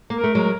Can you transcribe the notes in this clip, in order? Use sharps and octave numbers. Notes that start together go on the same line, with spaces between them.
A#3
A#4
A3
F#3 G#3